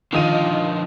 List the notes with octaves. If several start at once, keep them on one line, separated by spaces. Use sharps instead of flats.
D3 D#3 F3 F4 D#5 D#7